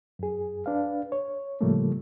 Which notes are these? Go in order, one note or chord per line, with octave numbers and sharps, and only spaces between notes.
F#2 G#4
D4 B4 F5
C#5
A2 C#3 F3 G3 A3 A#3